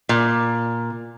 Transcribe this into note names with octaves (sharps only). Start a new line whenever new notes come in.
A#2